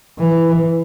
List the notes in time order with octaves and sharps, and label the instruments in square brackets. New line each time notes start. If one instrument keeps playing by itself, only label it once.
[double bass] E3